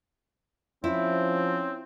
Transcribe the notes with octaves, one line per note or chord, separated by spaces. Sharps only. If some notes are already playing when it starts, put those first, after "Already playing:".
F3 C4 C#4 E4